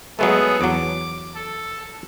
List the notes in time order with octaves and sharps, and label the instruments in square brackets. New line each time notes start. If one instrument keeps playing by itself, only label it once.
[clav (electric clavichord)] F#3 G#3 A3 [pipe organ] B3 G#4 A4
[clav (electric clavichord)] E2 F#3 [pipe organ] D6
[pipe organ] A4